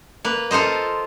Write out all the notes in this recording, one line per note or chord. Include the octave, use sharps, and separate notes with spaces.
A#3 B4
F4 A4 A#4 C5 D#5